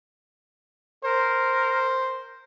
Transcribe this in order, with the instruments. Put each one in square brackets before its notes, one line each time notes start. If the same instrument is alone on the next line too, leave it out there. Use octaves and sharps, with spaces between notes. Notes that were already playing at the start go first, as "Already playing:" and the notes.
[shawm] A#4 [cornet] C5